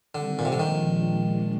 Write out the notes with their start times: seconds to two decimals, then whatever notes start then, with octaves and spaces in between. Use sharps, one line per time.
0.15 D3 D#3 G3 C4 G4
0.39 A#2
0.45 C3
0.52 D3
0.59 A#2 D#3 F3 G#3 D4